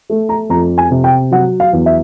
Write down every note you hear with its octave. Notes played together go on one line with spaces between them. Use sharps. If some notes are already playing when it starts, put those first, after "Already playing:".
A3
A#5
F2 A#5
G#5
C3
G5
F#3 F#5
F5
E2
E5